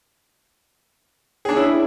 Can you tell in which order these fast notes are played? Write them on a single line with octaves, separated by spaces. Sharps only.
G#4 D4 C#4 E4